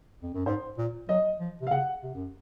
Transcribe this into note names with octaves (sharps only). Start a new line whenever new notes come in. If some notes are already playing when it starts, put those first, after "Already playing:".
F2
F#2
G#2 C5
A#2
F#3 D#5
F3
C3
F5
C#3 F#5
C3
F#2